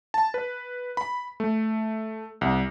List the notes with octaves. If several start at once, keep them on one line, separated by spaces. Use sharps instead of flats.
A5
B4
B5
A3
C2